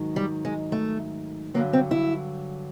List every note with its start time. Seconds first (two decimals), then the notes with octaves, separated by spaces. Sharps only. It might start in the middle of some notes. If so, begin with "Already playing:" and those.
Already playing: G#2 D#3 F#3
0.16 G3
0.45 G#3
0.72 A3
1.54 G2 D3 F#3 A#3
1.73 C4
1.91 E4